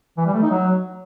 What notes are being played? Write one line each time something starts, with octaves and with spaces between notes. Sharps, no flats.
E3
G3
A3
D#4
F#3